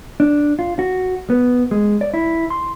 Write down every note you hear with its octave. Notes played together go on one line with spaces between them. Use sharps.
D4
F4
F#4
B3
G#3
D5
E4
C6